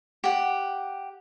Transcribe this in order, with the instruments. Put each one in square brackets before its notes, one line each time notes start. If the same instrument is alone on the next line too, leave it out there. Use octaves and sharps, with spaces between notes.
[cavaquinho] G4 F#5